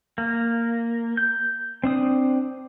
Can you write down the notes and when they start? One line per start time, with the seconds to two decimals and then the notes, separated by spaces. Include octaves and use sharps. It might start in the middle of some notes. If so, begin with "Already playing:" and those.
0.18 A#3
1.17 G6
1.84 C4 D4 D#6